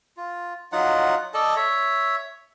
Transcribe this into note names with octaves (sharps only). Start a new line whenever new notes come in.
F4
F#3 D#4 F4 F#5
A4 D5 D#5 A5
C#5 E5